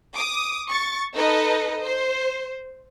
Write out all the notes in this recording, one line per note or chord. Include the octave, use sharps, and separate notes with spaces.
D6 D#6
C#6 A6
D#4 A4 B4 D#5
C5